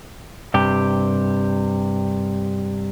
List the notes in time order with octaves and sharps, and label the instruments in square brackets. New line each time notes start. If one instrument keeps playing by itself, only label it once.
[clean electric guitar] G2 C3 G4